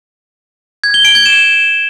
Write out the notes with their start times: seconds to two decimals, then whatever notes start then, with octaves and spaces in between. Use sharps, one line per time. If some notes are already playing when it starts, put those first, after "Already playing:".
0.84 G#6
0.94 G7
1.05 D7
1.15 G#6
1.26 E7